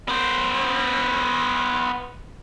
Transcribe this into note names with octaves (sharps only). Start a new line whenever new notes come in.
B3 C5